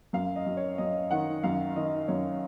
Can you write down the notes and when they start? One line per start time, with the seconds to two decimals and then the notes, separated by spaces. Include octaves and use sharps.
0.13 F#2 F5
0.36 D#5
0.46 F#2
0.57 C#5
0.78 F#2 D#5
1.11 D#3 F#5
1.43 F#2 F5
1.76 D#3 D#5
2.08 F#2 C#5